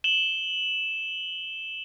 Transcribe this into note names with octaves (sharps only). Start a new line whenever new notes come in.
E7 F#7 G7